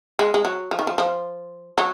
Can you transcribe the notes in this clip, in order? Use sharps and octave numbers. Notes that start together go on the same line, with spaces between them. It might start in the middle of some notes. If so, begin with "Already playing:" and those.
G#3
G#3
F#3
F3
D#3
F3
F3
F#3